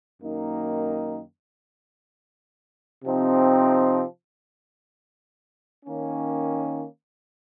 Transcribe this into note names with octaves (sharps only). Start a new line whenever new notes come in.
F#2 D#3 A#3 D#4
C3 F3 C4 D#4
D#3 A#3 C#4